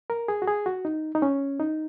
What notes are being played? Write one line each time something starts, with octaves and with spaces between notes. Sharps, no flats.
A#4
G#4
F#4
G#4
F#4
D#4
D#4
C#4
D#4